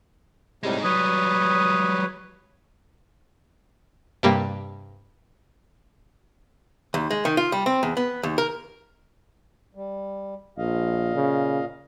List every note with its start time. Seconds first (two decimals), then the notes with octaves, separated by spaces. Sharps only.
0.63 A2 C3 G3 G#3 D#4
0.84 F#3 G3 B4 C#5 D#6
4.23 G2 C3 G3 A#3
6.94 D#2
7.11 G#3
7.25 D#3
7.37 F4
7.52 G3
7.66 C4
7.83 E2
7.97 B3
8.23 D#2
8.38 A#4
9.75 G3
10.58 A#1 A#2 D#5 F5
11.15 C#3